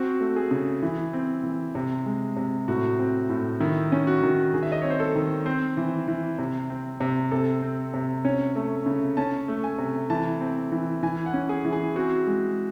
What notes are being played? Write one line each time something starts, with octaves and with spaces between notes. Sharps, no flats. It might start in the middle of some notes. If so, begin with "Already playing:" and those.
Already playing: C4 F#4
A3
G#4
C#3
E3
C4
E3
C3
G#3
C3
A2 F#4
C4
A2
D#3 E4
C#4
F#4
D#3
D#3 G#4
E5
D#5
C4 C#5
C5
A4
D#3
C4 C5
E3
E3
C3
C4
C3
C3 A4
C4
C3
C#4 C#5
A3
C#3
C#4 A5
A3
G#5
C3
E3 A5
C4
E3
E3 G#5
F#5
C#4
G#4
E3
G#4
C4 F#4
G#3